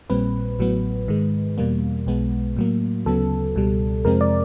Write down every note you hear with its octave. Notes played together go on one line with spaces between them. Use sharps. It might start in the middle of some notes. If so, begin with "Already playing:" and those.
A#1 A#2 G3 C4 B4
A1 A2 F#3 B3
G#2 D#3 G#3
E2 B2 G3 A#3
B1 B2 G#3 B3
A2 F#3 A#3
D2 C#3 F#3 B3 A4
C#2 B2 G3
F2 C3 F3 G#3 C4 A#4
D5